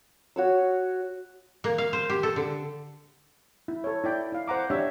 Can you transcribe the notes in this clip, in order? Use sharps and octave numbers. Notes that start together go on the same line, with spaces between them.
F#4 C#5 E6
A#3
F5
C5
G4
A4
D3
E4
A4 C#5
E4 D5 G5
E4 F5
C5 F#5 A#5 D6
D4 G4 C#5 E5